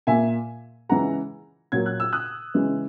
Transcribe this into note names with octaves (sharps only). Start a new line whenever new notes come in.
A#2 A#3 E5 G#5
C#3 E3 G#3 F#5 A#5
A#2 F#3 A#3 G#6
F#6
E6
D#6 F#6
C#3 E3 G#3